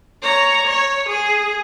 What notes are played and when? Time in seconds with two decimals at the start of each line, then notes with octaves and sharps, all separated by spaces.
0.22 C#5 A#5
0.66 C#5
1.08 G#4